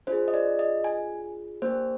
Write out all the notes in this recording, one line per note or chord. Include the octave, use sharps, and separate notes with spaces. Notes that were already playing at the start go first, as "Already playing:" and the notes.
D4 F4 G#4 C5
D#5
D5
D#5
G#5
A#3 D4 G4 C5